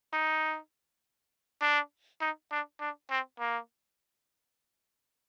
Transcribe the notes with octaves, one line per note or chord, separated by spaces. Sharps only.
D#4
D4
D#4
D4
D4
C4
A#3